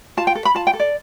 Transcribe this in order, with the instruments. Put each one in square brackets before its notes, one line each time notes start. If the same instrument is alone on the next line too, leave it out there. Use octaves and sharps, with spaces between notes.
[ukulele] F4 A5
G5
A4
B5
F4 A5
G5
A4
D5